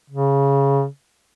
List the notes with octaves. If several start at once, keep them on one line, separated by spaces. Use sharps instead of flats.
C#3